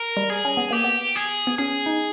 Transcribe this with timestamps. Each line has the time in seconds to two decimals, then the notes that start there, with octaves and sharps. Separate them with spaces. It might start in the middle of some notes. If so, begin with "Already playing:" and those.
Already playing: A#4
0.17 G3
0.30 G#4
0.45 C#4
0.57 B3
0.71 A#3 G4
0.84 B3
1.15 G#4
1.47 B3
1.58 C#4 G#4
1.86 D#4